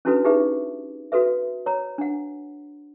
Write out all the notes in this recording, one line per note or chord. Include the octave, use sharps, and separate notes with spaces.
C#4 D4 E4 F#4 A4 B4
D#4 F4 G4 G#4 B4 E5
F#4 A4 B4 E5
C#5 A#5
D4 F#5